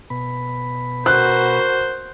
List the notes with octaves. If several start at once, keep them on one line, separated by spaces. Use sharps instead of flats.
B2 B5
F#4 A#4 C5 F#6